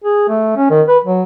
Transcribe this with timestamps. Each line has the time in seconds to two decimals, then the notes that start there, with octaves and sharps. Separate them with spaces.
0.04 G#4
0.29 A3
0.57 C#4
0.70 D#3
0.88 B4
1.04 F#3